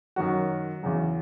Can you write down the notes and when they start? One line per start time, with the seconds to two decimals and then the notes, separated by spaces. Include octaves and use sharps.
0.16 F#2 D#3 F#3 F#4
0.83 E2 C#3 F#3